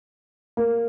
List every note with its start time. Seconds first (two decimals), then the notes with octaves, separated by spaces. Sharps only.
0.57 A#3